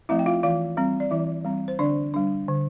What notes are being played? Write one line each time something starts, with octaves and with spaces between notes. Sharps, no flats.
F3 A3 C4 E4 E5
G5
F4 F5
E3 F4 F5
G3 C4
D5
E3 E4 E5
G3 C4
C5
D3 D4 D5
G3 D4
D3